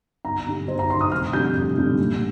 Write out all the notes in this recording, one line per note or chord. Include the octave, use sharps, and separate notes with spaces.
G1 A#5
G2 D3
G1 C5
A#5
G2 C6
D3
D#6
F1 F6
F2 D3 G3 G6
F1
F2 D3 G3
A#1